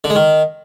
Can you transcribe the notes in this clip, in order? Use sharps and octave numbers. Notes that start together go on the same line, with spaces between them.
D3
G#3
D#3